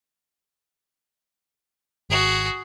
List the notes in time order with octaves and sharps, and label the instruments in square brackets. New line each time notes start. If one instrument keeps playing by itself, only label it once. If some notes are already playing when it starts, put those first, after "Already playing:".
[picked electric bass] G#1 [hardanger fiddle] F#4 G#4